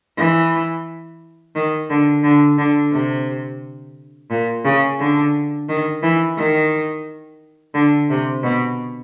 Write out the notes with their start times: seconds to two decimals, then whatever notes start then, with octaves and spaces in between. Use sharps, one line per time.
0.17 E3
1.55 D#3
1.90 D3
2.23 D3
2.58 D3
2.92 C3
4.31 A#2
4.65 C#3
4.99 D3
5.69 D#3
6.03 E3
6.37 D#3
7.74 D3
8.10 C3
8.43 B2